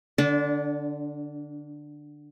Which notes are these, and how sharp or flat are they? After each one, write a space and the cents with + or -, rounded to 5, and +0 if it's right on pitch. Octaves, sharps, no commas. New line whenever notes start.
D3 +10 D4 -25